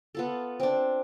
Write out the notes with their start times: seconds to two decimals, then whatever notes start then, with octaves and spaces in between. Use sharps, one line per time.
0.15 B3 F4 A4
0.60 C4 D4